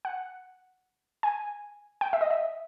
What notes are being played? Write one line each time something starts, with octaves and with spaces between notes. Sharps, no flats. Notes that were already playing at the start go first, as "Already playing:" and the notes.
F#5
G#5
G5
E5
D#5
E5